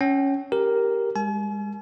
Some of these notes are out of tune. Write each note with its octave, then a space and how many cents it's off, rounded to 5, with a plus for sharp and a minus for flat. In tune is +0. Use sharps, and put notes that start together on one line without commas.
C#4 +0 G5 -40
G4 +0 A#4 +0
G#3 -35 G#5 +45